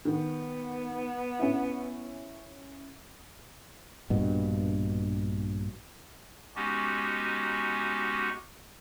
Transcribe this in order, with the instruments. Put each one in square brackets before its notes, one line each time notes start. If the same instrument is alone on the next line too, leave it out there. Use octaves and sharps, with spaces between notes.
[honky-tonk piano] D#3 [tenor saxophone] B3
[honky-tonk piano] C#4 E4
[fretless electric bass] A#1 G2 B2
[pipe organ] G#3 B3 C#4 D#4 F#4 G4